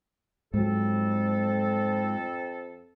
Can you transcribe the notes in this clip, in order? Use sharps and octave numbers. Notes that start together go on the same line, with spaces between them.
F2 G#2 F#3 C4 A4